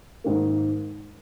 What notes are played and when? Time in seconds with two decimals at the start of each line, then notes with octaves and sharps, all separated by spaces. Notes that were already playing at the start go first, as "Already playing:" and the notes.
0.24 G#2 D#3 A#3